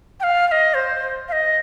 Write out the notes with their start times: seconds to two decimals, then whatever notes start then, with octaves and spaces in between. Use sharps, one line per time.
0.20 G5
0.23 F5
0.47 F5
0.52 D#5
0.74 C5
1.28 F5
1.32 D#5